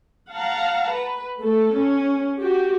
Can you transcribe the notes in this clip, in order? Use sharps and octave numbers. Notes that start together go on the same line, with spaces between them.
F5 F#5 A5 A#5
B4
A3 A4
C#4
F#4 G4